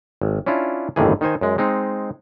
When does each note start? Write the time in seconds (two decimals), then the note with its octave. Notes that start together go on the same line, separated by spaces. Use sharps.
0.22 G#1
0.46 C#4 D4 E4 F4
0.96 G1 D#2 A2 D#3 E3 G#4
1.21 D#3 D#4 C5 G#5
1.41 F#2 G#3
1.58 G#3 C4 D#4